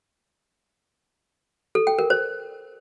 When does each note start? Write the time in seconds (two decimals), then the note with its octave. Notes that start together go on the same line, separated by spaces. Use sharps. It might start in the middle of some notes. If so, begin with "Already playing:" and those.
1.75 A4
1.87 G5
1.99 A#4
2.10 C5